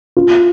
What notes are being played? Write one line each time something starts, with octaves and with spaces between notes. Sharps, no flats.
F4